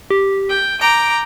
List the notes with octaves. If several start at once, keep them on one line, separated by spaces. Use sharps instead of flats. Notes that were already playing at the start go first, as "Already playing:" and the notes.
G4
G5
G5 A#5 D6 D7